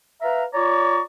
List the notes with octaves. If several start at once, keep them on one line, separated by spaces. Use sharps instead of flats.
B4 E5 F5 A#5
F4 C#5 D5 A#5 C#6